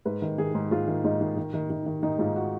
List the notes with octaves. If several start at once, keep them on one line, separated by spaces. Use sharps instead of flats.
G#2 B4
D#3
D#3 G#4
G#2
G#2 F4
D#3
G#2 D#4
D#3
D#3
D#3
D#3
D#3
D#3 D#4
G#2 F4
F#4